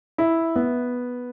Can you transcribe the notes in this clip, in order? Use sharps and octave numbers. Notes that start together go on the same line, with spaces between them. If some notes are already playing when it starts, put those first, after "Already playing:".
E4
B3